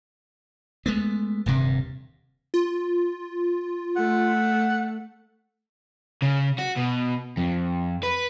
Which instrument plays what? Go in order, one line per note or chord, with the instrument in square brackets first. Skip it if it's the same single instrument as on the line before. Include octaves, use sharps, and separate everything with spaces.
[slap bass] G#3 A3 B3
D#1 G2 C3
[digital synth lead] F4
[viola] A3 [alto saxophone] F#5
[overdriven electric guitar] C#3
F#4
B2
F2
B4